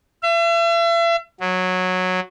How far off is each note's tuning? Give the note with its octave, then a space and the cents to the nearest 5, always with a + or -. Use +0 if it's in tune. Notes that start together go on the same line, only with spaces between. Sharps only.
E5 +40
F#3 -10